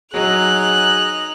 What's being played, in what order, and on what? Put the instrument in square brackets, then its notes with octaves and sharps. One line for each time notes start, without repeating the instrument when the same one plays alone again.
[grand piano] F#3 [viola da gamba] D#4 [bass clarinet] G#4 [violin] F#6 F7